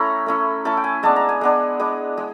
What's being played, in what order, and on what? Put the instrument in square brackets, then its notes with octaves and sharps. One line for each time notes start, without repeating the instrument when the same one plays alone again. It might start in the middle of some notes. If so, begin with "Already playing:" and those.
Already playing: [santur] A3 C#4 E4 A#5
A3 C#4 E4
A3 C#4 E4 A5
G5
G#5
G#3 B3 D4 A5
A#5
G#5
G#3 B3 D4
G#3 B3 D4
G#3